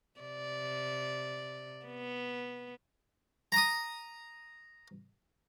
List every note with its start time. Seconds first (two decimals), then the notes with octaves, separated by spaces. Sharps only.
0.20 C3 D5
1.85 B3
3.52 A#5 D#6